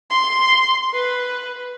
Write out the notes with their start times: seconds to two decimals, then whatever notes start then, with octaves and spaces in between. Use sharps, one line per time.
0.10 C6
0.93 B4